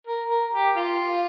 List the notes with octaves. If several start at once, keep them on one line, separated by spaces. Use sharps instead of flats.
A#4
A#4
G4
F4